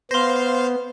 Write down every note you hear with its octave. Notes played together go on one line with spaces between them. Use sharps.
B3 C5 F5 C6 A#6